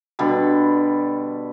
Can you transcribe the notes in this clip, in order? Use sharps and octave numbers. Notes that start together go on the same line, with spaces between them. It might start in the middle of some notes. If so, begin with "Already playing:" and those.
B2 D3 G3 B5